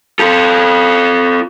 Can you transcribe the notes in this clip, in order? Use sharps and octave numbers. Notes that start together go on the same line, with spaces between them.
F4 A4